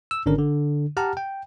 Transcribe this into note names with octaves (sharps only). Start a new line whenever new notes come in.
E6
G#1 D3 C#4 D4 A#4
D3
G4 F#5 A5 A#5 F6
G5